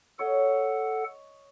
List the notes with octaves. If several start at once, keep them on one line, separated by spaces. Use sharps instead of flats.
A4 C#5 D#5 F#5